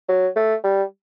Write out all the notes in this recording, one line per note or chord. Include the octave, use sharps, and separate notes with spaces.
F#3
A3
G3